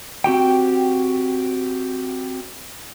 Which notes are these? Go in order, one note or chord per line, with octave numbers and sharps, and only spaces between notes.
C4 F#4 G4 G5